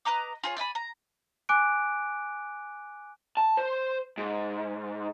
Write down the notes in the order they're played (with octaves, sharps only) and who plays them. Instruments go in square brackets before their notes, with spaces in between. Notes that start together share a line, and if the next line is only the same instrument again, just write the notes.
[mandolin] B4 D#5 A#5 D6
F4 G#4 C#5
D5 E5 G#5 B5
A#5
[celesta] G#5 D6 F#6 D7
[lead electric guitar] A5
C5
G#2